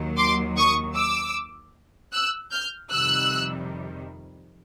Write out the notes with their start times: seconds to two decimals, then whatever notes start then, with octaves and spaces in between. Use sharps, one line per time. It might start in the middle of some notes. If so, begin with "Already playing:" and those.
Already playing: D#2 D#3 F#3
0.17 C6 D6
0.56 C#6 D#6
0.95 D6 E6
2.12 E6 F#6
2.51 F6 G6
2.91 F2 C3 D#3 G3 E6 F#6